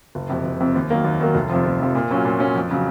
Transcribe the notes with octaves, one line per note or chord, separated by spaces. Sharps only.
F#1
F2 C3
F#1
F2 C3
D#2
D#3 F#3 A#3
D#2
D#3 F#3 A#3
F1
F2 C3 F3
F1
F2 C3 F3
A#2
F#3 C#4 F4
A#2
F#3 C#4 F4
F2
C#3 F#3